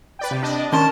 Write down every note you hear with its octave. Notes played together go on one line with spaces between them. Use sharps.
B4 D5 G5
C3
D4 D5 D#5
D#3 C#4 A#4 A5 C6